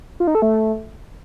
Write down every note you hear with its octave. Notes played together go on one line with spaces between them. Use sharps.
F4
D#4
A4
A3